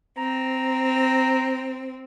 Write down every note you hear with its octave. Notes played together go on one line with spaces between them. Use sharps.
C4 A#5